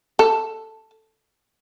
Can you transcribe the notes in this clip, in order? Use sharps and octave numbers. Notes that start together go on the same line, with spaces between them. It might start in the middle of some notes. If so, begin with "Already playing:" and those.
A4